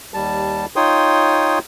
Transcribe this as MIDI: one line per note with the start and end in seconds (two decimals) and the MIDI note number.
0.14 0.66 39
0.14 0.66 55
0.14 0.66 81
0.76 1.59 63
0.76 1.59 65
0.76 1.59 73
0.76 1.59 79
0.76 1.59 84
0.76 1.59 87